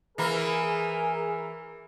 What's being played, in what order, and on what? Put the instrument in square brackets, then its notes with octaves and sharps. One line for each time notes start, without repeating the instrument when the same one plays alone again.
[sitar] E3 A#3 [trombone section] G#4 A#4